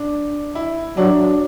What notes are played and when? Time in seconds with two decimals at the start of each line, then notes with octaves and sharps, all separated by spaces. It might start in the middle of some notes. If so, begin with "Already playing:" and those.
Already playing: D4
0.55 E4
0.97 F#3 D4